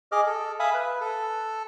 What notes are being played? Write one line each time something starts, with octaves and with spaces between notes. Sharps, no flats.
G#4 D#5 D6 F6
A4
E5 F5 G#5 B5 D#6
B4
A4